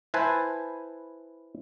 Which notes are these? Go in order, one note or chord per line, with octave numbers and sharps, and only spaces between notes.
E4 B4 C5 G#5 A5